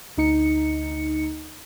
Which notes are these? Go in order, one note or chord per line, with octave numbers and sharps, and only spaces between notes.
D2 D#4 C#7